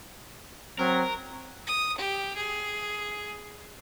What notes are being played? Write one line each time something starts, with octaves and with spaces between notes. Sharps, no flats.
F#3 C4 A#4
D#6
G4
G#4